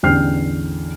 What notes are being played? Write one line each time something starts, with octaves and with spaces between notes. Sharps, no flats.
A1 E2 D3 G5 F6 C7